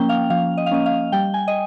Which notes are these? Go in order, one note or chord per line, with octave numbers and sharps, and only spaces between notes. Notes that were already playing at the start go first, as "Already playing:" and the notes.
Already playing: F3 A#3 C#4 G5
F5
F3 F5
D#5
F5
A#3 C#4 D#5
F5
G3 G5
G#5
D#5